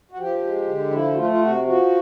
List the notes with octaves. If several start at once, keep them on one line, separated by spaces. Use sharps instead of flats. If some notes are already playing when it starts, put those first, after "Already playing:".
F#4
F3 G4
G#3
D3
F3 E4
F#4
A3 F4
F4
C3 F#4
F3 F#4